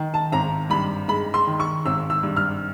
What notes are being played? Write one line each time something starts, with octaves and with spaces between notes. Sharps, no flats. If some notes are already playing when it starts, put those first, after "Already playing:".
Already playing: D#3
A5
G#1 A#5
G2 B5
G#3 B5
C6
D#3
C#6
G#1 E6
E6
G2
F6